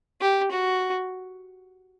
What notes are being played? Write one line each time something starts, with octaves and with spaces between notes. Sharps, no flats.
G4
F#4